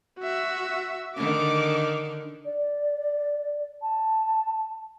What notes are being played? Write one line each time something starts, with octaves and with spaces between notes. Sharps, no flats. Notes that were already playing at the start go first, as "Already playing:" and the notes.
F#4 E5
D3 D#3 D6
D5
A5